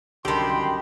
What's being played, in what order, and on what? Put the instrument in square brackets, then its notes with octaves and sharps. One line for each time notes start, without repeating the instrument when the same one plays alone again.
[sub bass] C2 [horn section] F#2 B5 C6 [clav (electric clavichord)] D3 A5 [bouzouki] D#3 G4